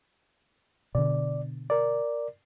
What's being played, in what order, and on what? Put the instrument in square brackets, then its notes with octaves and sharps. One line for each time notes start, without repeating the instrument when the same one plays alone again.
[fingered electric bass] B2 D3 [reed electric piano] D5
[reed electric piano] A#4 D5